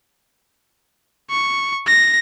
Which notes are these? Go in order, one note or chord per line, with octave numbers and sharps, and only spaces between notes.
C#6
A#6